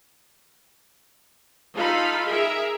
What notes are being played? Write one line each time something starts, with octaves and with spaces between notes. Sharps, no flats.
D#4 F4 A4 F5 B5
G#4 A#4 E5